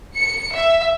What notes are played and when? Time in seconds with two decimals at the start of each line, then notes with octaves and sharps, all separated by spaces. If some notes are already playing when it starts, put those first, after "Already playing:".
0.17 C#7
0.53 E5